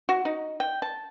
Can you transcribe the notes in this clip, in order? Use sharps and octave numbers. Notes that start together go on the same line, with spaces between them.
F#4
D#4
G5
A5